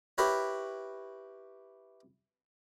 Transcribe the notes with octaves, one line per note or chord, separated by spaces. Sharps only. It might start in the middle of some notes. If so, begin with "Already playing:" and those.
E4 G4 A#4 B4 C#5